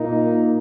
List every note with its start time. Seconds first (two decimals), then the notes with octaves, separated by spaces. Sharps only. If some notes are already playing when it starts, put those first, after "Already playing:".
Already playing: A#2 A#3 D#4